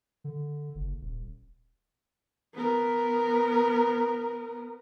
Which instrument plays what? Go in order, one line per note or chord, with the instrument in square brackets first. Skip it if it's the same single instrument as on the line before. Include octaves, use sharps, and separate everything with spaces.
[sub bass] D3
F#1
D#1
[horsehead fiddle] B3 A#4